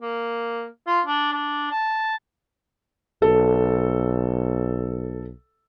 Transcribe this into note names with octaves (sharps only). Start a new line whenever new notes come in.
A#3
F4
D4
D4
A5
B1 A4